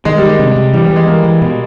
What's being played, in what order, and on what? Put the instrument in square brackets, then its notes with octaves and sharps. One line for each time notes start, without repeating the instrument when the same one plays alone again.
[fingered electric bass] D#3 [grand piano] G#3
[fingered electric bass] D#3 [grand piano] G3
[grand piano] G#3
[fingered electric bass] C3
C3
[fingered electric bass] E3 [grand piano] G3
[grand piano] G3
[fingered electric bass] E3
[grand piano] G#3
[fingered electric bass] E3 [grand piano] A#3
[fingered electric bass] E3
B2